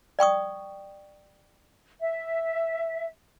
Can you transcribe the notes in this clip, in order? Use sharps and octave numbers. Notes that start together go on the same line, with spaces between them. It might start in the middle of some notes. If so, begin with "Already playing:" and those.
D5 G5 C#6 D#6
E5